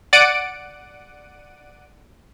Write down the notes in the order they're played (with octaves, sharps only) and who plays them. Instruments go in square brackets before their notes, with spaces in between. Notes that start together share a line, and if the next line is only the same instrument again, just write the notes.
[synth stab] D5 F#5 D7 D#7